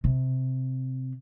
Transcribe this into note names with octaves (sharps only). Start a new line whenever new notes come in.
C3